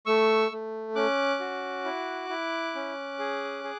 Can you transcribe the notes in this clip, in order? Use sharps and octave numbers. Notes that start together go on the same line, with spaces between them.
A3 C#6 E6
A3
C#4 D6 F#6
F#4
E4
E4
C#4
G#4
G#4